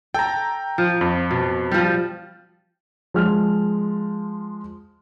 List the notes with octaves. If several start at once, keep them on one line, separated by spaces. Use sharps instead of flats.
A4 G5 A#5
F3
F2
B2
F3 G3
F3 G#3 F6